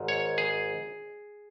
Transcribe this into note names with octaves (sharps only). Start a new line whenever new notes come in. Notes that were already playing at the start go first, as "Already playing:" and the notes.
Already playing: G#1 G#2
C#5
G#4